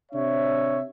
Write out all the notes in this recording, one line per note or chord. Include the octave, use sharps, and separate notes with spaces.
C3 D4 C#5 E5